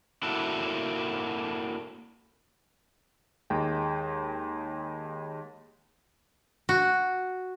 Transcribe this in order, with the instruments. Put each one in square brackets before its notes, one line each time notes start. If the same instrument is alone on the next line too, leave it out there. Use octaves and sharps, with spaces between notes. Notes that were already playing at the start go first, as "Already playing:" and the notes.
[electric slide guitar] A#3 D4 E4 F#4 A4
[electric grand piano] D#2 G#3 G5
[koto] F#4